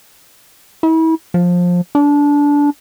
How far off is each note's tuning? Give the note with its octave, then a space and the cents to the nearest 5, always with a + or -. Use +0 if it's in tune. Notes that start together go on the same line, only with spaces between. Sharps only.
E4 -35
F3 +20
D4 -20